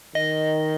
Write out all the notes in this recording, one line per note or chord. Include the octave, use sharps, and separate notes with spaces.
D#3 D#5